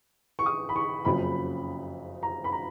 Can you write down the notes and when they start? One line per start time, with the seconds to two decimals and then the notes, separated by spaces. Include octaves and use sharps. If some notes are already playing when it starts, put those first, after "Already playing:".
0.39 C#6
0.46 D#6
0.69 B5
0.76 C#6
1.05 F#1 F2 C#3 F#3 B5
2.23 A#5
2.44 B5
2.52 A#5